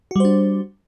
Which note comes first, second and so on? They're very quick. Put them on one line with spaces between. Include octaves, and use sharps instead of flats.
F#4 G3 C5 D4